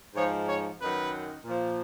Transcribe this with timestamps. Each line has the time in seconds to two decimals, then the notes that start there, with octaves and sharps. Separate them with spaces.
0.15 G#2 F3 C#5
0.47 C#5
0.80 F#2 D#3 F#3 B4
1.44 A#2 F3